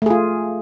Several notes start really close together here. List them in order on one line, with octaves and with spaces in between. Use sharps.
A3 G#4 F4